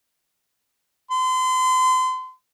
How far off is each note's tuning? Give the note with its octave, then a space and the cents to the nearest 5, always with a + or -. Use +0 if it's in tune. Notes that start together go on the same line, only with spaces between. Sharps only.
C6 -35